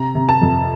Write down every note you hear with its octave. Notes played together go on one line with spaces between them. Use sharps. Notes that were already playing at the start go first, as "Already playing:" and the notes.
Already playing: C3 A#5
C3
A5
F2